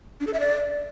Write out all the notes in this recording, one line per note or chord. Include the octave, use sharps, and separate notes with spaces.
D4
A4
E5
D5